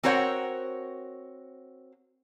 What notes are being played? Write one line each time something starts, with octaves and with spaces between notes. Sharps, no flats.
C4 F#4 A#4 C5 C#5 F#5